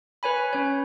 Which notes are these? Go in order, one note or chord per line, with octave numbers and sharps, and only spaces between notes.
B4 C#5 G#5 B5
C#4 C#5